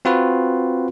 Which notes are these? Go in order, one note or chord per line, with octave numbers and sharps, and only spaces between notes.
C4 F4 F#4 B4